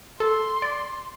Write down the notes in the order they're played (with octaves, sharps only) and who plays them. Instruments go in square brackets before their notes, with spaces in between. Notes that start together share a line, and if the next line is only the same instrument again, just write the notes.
[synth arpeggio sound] A4 [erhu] C6
[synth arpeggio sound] D5